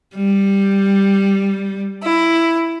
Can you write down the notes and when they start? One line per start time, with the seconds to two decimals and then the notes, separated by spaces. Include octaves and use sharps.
0.14 G3
2.04 E4